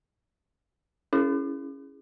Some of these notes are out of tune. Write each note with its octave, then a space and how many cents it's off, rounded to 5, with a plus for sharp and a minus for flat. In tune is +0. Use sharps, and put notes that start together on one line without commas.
C#4 +0 E4 +0 G#4 +0